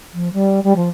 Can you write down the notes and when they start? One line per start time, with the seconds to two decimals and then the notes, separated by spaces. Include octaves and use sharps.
0.14 F3
0.33 G3
0.64 G3
0.76 F3